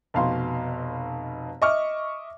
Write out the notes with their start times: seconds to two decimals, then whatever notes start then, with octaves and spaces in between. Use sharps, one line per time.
0.14 F1 B2 F5 C6
1.62 D#5 E5 C#6 D6 F6